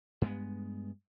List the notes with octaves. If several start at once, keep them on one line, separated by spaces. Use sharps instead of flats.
G2 G#3 B3